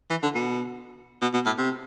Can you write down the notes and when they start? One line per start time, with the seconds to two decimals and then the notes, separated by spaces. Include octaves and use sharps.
0.10 E3
0.23 D3
0.34 B2
1.22 B2
1.34 B2
1.46 A2
1.58 C3